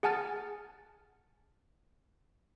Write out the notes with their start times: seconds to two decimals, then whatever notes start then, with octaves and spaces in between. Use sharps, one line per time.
0.03 G#4 F#5 G#5 A5 F6 A6